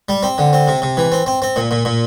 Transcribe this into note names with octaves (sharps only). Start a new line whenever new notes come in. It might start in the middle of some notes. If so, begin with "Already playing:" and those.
G3
C4
D3
C4
C3
C3
E3
C4
C4
C4
A#2
A#2
A#2